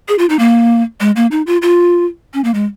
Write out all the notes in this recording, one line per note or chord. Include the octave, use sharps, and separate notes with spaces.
G#4
F4
D#4
A#3
G#3
A#3
D#4
F4
F4
C#4
A#3
G#3